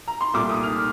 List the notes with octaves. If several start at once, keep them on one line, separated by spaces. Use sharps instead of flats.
A#5
C6
C2 A#2 A3 D6
D#6
F6